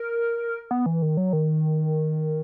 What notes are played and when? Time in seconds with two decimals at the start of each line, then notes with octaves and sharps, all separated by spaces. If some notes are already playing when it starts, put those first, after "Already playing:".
Already playing: A#4
0.71 B3
0.86 E3
1.02 D#3
1.17 F#3
1.33 D#3